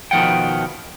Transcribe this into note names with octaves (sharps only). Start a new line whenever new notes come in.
B2 D#3 F3 F#5 G5